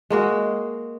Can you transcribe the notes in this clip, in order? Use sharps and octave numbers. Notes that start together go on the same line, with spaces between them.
G#3 A#3 F#4